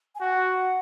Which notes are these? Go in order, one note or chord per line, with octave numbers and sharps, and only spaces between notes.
G#5
F#4 F#5